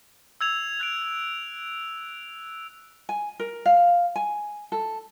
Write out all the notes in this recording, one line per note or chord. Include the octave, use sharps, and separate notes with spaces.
E6 G#6 F7
F#6 G#6 D7
G#5
A#4
F5
G#5
A4